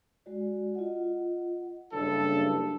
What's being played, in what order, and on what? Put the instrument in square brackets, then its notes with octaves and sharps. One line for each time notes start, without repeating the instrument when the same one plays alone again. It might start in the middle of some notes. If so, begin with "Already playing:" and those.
[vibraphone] G#3 F#4 D5
F4 D#5 F#5
[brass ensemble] F#1 G2 A4 [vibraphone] D4